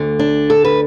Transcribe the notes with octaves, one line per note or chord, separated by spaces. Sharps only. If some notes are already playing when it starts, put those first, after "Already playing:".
Already playing: D2 D3
D4
A4
B4